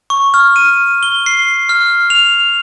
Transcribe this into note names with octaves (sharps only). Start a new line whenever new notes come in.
C#6
F6
D#7
G7
C7
F6
F7